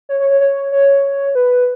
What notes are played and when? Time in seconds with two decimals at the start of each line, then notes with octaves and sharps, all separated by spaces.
0.09 C#5
0.20 C#5
0.30 C#5
0.41 C#5
0.72 C#5
1.35 B4